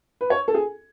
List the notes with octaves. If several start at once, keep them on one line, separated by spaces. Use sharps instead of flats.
B4
C#5
A4
G#4